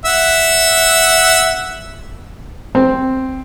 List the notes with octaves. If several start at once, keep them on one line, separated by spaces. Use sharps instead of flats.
E5 F#5
C4